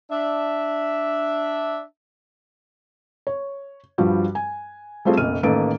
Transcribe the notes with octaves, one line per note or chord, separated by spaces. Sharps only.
D4 E5
C#5
G2 F3 G3 F#4
G#5
G3 A3 C4 F4 G#4
F#1 B1 F6 D#7
A1 D#3 A#3 A4 B4 D7